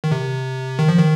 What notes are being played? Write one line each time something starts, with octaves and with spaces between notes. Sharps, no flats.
D#3
C3
D#3
F3
D#3